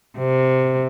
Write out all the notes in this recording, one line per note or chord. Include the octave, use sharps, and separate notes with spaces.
C3